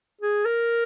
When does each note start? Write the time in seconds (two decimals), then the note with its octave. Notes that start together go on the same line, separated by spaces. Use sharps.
0.21 G#4
0.46 A#4